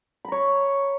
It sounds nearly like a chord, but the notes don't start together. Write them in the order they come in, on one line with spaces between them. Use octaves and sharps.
B5 A#5 C#5